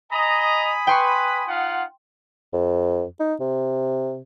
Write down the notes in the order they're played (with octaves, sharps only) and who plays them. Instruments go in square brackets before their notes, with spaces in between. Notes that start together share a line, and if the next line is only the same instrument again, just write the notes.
[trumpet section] D#5 A#5 [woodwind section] G#5 B5 D#6
[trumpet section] B4 [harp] G5 C6 C#6
[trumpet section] D#4 F4 F#5
[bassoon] F2
D#4
C3